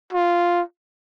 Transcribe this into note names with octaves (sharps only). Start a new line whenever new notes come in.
F4